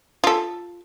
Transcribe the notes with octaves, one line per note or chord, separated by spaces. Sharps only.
F4 A4